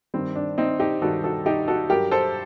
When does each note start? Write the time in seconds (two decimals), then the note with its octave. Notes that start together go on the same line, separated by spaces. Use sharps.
0.14 G2 D#3 G3 C4
0.36 D4
0.58 C4 D#4
0.80 D#4 G4
1.02 G2 D#3 G3 F#4 A4
1.24 F#4 A4
1.46 D#4 G4
1.68 F#4 A4
1.90 G2 F#3 G4 A#4
2.12 A4 C5